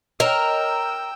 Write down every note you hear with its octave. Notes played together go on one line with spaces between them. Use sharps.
A#4 C#5 D#5 G5 E6